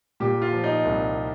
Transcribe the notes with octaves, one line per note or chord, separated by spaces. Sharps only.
A#2 G4
F4
F3
D#4
C2